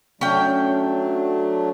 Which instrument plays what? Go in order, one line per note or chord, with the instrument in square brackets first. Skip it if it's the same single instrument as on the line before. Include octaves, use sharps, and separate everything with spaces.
[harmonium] F#3 A3 D4 [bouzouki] C#4 G5